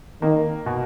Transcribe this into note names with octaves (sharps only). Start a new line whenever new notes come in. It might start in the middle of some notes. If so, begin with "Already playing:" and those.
D#3 A#3
B2